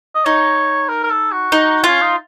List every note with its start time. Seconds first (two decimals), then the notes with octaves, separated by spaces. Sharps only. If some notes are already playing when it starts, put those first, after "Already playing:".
0.15 D#5
0.25 D#4 C#5
0.88 A#4
1.04 A#4
1.10 A4
1.31 F#4
1.52 D#4
1.84 C#4 F4
2.01 D#4